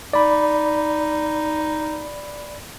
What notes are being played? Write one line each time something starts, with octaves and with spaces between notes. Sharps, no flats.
D#4 D5 B5